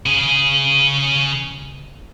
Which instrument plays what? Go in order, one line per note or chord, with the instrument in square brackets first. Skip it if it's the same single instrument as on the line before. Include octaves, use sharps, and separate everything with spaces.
[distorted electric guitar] C#3 G#4